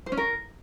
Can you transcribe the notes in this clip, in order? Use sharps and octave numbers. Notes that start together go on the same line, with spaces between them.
C5
C#4
A#4